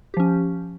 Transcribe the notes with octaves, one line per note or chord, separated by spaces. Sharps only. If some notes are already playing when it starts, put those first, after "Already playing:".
F3 C#4 G4